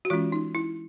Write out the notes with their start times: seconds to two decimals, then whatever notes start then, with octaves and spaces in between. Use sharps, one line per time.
0.05 F#4
0.10 E3 G#3 C#4 F4
0.32 D#4
0.55 E4